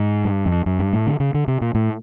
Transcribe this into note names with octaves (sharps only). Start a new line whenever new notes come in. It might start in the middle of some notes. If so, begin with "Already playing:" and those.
Already playing: G#2
G2
F2
F#2
G2
A2
D3
C#3
D3
C3
A#2
A2